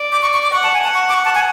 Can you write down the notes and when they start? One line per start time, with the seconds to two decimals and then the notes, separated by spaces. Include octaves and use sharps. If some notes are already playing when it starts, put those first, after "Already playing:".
Already playing: D5
0.12 D6
0.22 C#6
0.33 C#6
0.43 D6
0.53 F#5 C#6
0.63 A5
0.74 G#5
0.84 F#5 A5
0.94 C#6
1.09 D6
1.14 C#6
1.25 A5
1.35 G#5